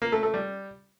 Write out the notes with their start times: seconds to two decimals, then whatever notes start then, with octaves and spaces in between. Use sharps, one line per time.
0.02 A#3
0.12 A3
0.23 A3
0.34 G3